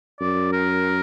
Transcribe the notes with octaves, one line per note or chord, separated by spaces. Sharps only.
F#2 D5
A#4